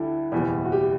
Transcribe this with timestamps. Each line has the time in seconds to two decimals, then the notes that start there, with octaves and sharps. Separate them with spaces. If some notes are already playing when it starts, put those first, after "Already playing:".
Already playing: D2 D3 G3 D4 E4
0.32 F#1 E2 B2 G3
0.65 F#4
0.72 G4